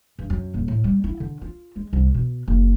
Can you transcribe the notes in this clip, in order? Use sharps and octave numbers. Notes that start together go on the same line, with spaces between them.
G2
F#2
D#1
A2
G3
E4
D3
F4
G#3
C2
B2
F#1